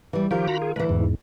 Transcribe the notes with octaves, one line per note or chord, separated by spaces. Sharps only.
E3 G3
D#3 F3 F4 G4 A#4
F#4 A#5 B5
G#4
D2 E3 B4
E2 G#2